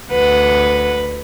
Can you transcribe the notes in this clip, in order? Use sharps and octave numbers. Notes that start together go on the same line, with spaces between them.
D2 B4 F#5